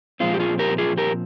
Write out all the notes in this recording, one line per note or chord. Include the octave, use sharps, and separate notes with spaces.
A#2 F3 G#3 C4 F4
G4
F4 G#4
G4 A#4
F4 G#4
G4 A#4